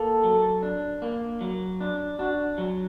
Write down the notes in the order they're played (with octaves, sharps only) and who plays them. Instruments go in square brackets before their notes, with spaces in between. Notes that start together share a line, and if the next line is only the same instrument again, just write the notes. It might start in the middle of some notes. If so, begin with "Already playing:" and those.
Already playing: [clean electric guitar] A#3 [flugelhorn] A4
[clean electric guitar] F#3
D4
A#3
F#3
D4
[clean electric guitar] D4 [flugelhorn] F#4
[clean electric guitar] F#3